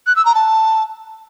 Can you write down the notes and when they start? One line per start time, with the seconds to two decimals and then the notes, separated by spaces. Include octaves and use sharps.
0.07 F#6
0.16 E6
0.26 A#5
0.35 A5